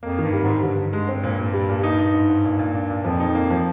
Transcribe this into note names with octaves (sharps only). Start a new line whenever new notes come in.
F2 A#3
G2 D#3
G3
G#2
G3
G2 D3
D3
G#3
C4
A#2
A#2
G3
A#2
D#4
D#4
G#2
G#2
A#2
A#2
D4
A#2
F2 F3
D#4
A#3
F3